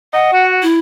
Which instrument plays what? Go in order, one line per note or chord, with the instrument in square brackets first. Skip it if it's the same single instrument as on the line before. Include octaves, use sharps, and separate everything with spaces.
[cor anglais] D#5 [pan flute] F#5
[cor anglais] F#4
[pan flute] E4